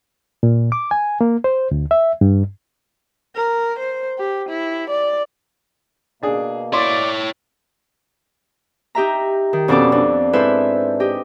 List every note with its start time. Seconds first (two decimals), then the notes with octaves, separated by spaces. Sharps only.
0.43 A#2
0.72 D6
0.91 G#5
1.21 A#3
1.44 C5
1.71 D2
1.91 E5
2.21 G2
3.36 A#4
3.79 C5
4.18 G4
4.49 E4
4.90 D5
6.23 B2 A#3 D4 G#4
6.73 E4 C#5 D5 C6
8.95 D#4 G4 E5 A#5
9.53 D#3
9.68 F2 B2 C#4 A4 D5 D6
9.92 F2 D4
10.33 G#2 E4 A4 B4 C5 E5
11.00 G4 D#5